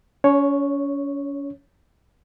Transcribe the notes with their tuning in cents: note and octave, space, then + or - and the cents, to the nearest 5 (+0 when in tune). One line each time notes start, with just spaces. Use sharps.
C#4 +35 C#5 +0